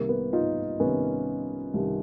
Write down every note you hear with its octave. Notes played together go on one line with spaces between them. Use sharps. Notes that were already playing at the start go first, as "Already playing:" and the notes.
Already playing: C2 C3 D#3 A#3
B3
D#4 F4
C2 C3 D#3 B3 C#4
C2 C3 D#3